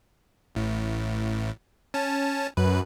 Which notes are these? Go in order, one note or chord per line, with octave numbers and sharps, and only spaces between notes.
A1 A2
C#4 A5
F#2 B4